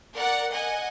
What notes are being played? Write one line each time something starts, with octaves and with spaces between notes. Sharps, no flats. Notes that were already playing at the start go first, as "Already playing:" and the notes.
A#4 D5 F#5
D#5 F#5 G#5